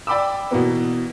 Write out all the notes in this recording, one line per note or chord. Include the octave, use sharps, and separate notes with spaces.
D5 G5 B5 D6 E6
B2 E3 A#3 B3